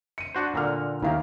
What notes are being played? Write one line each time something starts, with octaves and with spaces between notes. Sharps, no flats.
C#7 D#7
D4 F#4 C5
A#2 D3 A#5 F6
D#2 D#3 A#3 E4 F5